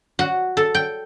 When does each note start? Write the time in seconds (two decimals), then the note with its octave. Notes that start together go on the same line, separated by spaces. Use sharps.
0.19 F#4
0.57 A4
0.74 G5